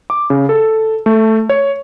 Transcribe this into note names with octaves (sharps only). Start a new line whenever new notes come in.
D6
C#3
A4
A3
C#5